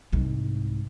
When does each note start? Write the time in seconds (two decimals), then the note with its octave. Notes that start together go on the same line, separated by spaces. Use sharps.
0.12 C2 G#2